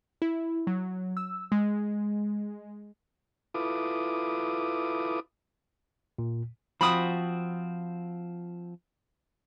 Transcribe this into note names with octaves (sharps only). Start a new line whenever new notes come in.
E4
F#3
E6
G#3
E4 F4 A4 B4 D6 D#6
A#2
F3 C4 F#4 B5 D#6